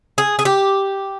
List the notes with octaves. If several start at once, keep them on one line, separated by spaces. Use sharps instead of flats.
G#4
G#4
G4